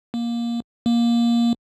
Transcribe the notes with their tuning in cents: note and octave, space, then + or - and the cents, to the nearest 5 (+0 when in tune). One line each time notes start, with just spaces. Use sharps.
A#3 +15
A#3 +15